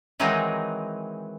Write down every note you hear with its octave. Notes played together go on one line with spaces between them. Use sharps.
D#3 E3 F#3 G#3 C4 D#4